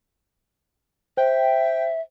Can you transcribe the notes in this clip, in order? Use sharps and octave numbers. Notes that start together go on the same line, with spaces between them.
C5 E5 G5